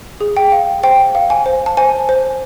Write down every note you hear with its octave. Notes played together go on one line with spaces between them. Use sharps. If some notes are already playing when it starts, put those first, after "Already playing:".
G#4
G5
F5
C5 G5
F5
G#5
C5
A5
C5 G#5
C5